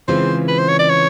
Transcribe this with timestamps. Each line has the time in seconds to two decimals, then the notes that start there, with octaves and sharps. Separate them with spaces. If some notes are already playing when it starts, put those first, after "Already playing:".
0.08 C#3 E3 G#3 C4 F4 C5
0.48 B4
0.59 C5
0.69 C#5
0.79 D5
0.89 C#5